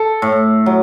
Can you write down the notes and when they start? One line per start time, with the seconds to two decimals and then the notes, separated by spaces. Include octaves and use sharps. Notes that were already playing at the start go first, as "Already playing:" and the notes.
Already playing: A4
0.22 A2
0.66 F#3